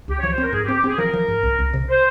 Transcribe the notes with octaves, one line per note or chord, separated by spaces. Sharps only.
C#2 G4
C#5
F3
C5
C4 A#4
G#2 G#4
G4
C4
G4
C4 G#4
F3 A#4
F3
G#2
C2
C2
C3
C5